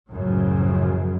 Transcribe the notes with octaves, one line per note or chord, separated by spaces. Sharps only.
F#1 C#2 F#2 A2 C#3 F3